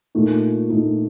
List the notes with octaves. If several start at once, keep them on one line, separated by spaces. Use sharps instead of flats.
A#2 A3 D#4
A#2 A3 D#4